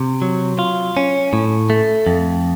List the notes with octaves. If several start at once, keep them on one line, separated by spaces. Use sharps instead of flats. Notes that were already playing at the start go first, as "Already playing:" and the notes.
Already playing: C3
F#3
F4
C#4
A2
A3
F2